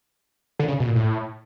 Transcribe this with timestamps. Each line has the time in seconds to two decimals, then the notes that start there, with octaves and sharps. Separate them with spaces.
0.59 D3
0.68 C#3
0.80 B2
0.86 A#2
0.95 A2